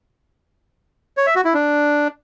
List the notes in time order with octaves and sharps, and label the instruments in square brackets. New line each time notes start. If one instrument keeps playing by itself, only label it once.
[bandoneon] C#5
E5
F#4
E4
D4